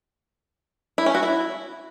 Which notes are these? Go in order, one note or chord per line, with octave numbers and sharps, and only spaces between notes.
E4
C#4
F#4
E4